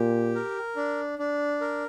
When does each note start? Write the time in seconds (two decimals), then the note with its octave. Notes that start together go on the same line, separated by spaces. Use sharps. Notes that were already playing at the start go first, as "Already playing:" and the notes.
Already playing: A#2 G4
0.35 A#4
0.76 D4
1.19 D4
1.61 A#4